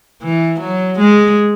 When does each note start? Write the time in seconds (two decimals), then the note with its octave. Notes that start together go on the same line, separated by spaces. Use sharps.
0.23 E3
0.60 F#3
0.99 G#3